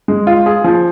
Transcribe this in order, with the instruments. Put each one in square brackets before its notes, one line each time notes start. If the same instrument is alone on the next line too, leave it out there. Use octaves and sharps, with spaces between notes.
[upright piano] G#3
F4
G#4
F3